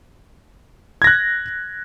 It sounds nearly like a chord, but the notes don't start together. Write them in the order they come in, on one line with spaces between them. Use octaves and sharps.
G#6 A#6 F#6